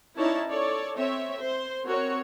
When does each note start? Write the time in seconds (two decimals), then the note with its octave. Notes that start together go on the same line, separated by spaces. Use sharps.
0.17 C#4 D#4 E4 C#5 D5 A5
0.48 A4 C#5 D5
0.95 C4 C#5 E5
1.39 C5
1.86 C4 F#4 A#4 C#5